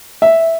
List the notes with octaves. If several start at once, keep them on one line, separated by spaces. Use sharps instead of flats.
E5